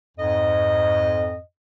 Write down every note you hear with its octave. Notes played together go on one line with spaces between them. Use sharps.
F2 G#2 D#5